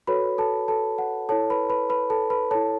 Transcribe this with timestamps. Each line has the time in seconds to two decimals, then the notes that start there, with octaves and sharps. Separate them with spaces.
0.07 F#4 A4 B4 C#5 B5
0.38 A4 A5
0.68 A4 A5
0.98 F#5
1.29 E4 A4 C#5 A5
1.50 B4 B5
1.70 B4 B5
1.90 B4 B5
2.10 A4 A5
2.30 B4 B5
2.51 E4 A4 C#5 A5